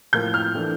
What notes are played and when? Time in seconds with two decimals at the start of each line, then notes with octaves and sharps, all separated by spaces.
0.13 A2 F3 A#3 G6
0.34 F6
0.54 E3 A3 D4